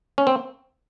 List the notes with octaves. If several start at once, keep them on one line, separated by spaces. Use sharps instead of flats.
C#4
C4